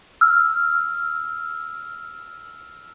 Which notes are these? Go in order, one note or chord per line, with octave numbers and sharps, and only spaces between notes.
E6 F6